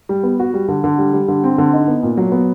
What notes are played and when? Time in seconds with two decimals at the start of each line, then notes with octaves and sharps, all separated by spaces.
0.09 G3
0.23 B3
0.39 F#4
0.54 G3
0.68 D3
0.84 D3
0.98 G3
1.13 G3
1.28 D3
1.44 C4
1.58 D3
1.73 D#4
1.87 B3
2.03 A#2
2.17 F#3
2.32 B3